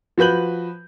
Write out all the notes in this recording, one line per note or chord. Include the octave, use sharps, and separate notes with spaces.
F3 F#4 B4 G6 F#7